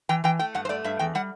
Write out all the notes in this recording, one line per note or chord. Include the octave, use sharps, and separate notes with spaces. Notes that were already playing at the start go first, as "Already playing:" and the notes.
E3 G5
E3 G5
A3 G5
G2 F#5
C5
A3 D5
G2 E5
E2 G5
G3 F#5